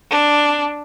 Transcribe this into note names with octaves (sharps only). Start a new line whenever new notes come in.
D4